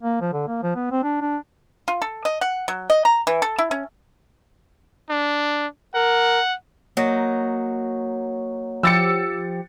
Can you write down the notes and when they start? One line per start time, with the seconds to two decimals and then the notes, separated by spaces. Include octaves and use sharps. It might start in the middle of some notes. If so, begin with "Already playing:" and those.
0.03 A#3
0.21 F3
0.33 D3
0.48 A#3
0.63 F3
0.76 B3
0.92 C4
1.03 D4
1.21 D4
1.88 F4
2.02 A4
2.25 D#5
2.41 F#5
2.68 F#3
2.90 D#5
3.05 A#5
3.27 E3
3.42 A4
3.59 E4
3.71 C#4
5.10 D4
5.95 A#4 F#5
6.97 F#3 A#3 D#4
8.83 F3 G4 E6 A6 C#7